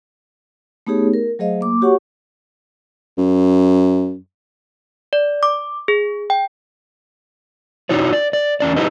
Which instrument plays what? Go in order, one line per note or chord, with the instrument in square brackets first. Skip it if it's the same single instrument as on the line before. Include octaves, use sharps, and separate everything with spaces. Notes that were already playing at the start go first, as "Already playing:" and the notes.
[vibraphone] A3 B3 D#4 G4 G#4 C#5
A#4
F#3 A3 G#4 C5 D#5 F5
A#3 D6
F#4 G4 C#5 F#5 C#6
[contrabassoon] F#2
[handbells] D5
D6
G#4
G5
[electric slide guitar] D#4 E4 F#4 C#5 D5
D5
D5
E2 C#4 D5
D#4 E4 G4 B4 D#5